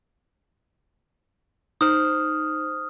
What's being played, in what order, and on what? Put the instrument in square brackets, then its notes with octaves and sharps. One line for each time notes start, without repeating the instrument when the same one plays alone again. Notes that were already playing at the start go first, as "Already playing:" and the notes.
[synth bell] D#4 C5 [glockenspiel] D#6 F6